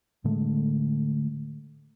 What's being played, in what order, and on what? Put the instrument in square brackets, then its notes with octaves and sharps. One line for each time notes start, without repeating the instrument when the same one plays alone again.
[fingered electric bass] A2 D3 G#3 A3